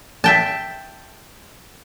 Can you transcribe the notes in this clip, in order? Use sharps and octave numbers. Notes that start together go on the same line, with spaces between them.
E5 G5 A5